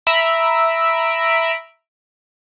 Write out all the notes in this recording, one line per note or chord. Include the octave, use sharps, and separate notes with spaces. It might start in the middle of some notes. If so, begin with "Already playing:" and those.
E5 A#5 B5 D7